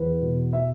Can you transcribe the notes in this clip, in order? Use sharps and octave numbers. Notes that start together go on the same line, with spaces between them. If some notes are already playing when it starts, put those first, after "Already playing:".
Already playing: E2 B4
B2
E5